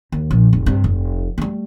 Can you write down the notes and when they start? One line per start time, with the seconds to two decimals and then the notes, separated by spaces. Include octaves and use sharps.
0.12 D#2
0.31 A#1
0.53 F1
0.66 G2 C3
0.84 F1
1.38 G3 A3